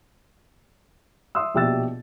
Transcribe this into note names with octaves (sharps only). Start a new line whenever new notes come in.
E5 C6 D#6 E6
A#1 B2 G4 E5 E6 A6